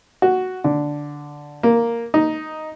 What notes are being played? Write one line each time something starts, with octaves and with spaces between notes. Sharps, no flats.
F#4
D3
A#3
D#4